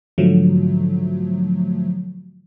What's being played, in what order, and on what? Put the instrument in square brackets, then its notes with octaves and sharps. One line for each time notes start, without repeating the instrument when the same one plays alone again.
[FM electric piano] G#2 D3 F3 F#3 A3